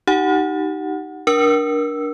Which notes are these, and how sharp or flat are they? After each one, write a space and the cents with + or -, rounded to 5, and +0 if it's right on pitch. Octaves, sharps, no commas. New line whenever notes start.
D#4 +0 G4 -25 F#5 +0
D4 -5 A#4 +25 E6 +0